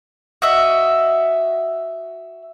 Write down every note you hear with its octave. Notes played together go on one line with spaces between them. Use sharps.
F#4 D#5 E5